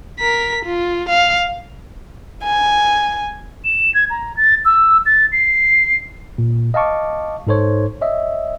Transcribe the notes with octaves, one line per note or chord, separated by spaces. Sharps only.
A#4 B6
F4
F5
G#5
E7
G#6
A#5
A6
E6
A6
C7
A#2
D#5 F5 A5 C#6 D6
G#2 D#4 A4 C5 C#5
C#5 D#5 E5